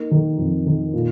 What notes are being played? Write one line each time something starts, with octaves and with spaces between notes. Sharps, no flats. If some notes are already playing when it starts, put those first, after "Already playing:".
Already playing: A#3 D#4
D#3
F2
D#3
A#2